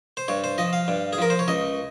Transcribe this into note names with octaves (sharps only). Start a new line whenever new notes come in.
C5
G2 C#5
C5
F3 D#5
F5
G2
G#4
F3 A#4
C5
C#5
C#2 D#5